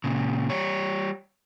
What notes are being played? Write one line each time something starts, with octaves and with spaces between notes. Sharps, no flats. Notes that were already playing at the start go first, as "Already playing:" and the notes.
A#2 C#3
G3 C#5